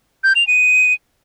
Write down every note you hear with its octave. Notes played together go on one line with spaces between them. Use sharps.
G6
F7
D#7